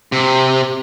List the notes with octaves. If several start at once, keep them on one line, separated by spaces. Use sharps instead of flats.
C3